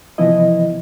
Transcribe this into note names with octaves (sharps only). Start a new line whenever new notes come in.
C3 E3 F3 B3 E4 D#5